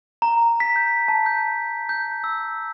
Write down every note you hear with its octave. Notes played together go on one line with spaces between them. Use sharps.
A#5
B6
G6
A5
G6
G6
E6